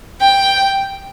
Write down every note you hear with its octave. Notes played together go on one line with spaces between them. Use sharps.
G5